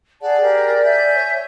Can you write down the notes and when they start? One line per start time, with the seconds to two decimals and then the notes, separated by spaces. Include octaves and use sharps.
0.21 G#4 D5 F#5 A5
0.41 G4 G#4 A#4
0.83 E5 G#5 G6
1.14 C#5